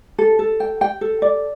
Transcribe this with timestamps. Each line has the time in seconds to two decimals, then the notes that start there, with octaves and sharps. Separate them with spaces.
0.18 A4
0.39 A4
0.60 G5
0.81 G5
1.01 A4
1.22 D5